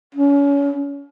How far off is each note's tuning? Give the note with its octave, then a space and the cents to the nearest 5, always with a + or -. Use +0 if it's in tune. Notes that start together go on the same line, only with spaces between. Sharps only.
C#4 +30